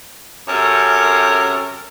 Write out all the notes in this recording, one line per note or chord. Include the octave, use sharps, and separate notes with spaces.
F#2 C3 C#4 A4 A#4 C#5